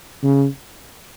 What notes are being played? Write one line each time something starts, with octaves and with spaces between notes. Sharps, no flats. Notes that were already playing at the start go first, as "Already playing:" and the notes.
C#3